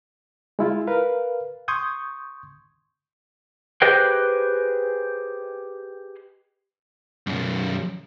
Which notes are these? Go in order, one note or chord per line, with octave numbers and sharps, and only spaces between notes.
G#3 E4 F4
A#4 B4 F5
C6 C#6 D#6 G6 G#6
G4 G#4 B4 C5 D#5 G5
B1 F#2